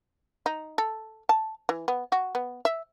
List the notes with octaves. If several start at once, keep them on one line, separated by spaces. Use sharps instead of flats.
D#4
A4
A5
E3
B3
F#4
B3
E5